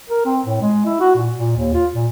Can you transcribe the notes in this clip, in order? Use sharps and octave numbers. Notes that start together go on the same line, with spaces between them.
A#4
C4
A2
G#3
E4
F#4
A#2
A#2
D#2
F4
A#2